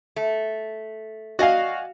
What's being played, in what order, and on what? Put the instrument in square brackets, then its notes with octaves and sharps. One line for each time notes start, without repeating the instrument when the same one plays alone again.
[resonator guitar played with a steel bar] A3
[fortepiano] F#4 F5 [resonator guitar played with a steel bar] D5 D#5 G#5